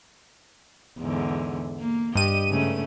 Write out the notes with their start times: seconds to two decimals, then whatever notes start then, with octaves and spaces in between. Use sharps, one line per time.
0.99 E2 G#2 D3
1.80 A#3
2.15 G2 G4 D#5 D#7
2.50 G#2 C#3 A3